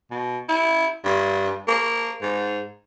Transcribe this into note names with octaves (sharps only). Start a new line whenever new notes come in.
B2
E4
G2
A#3
G#2